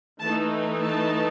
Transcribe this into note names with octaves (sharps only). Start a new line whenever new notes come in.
E3 A3 D#4 A5
A5